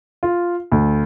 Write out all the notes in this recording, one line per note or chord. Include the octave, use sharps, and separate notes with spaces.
F4
D2